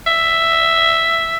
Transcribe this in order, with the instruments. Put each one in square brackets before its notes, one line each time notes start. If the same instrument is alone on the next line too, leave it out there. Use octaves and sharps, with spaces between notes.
[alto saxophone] E5